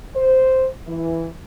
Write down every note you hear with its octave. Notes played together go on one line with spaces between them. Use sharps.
C5
E3